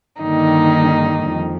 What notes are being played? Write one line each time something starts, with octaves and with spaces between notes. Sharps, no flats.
G2 D3 D#3 G3 A#3 D#4
F2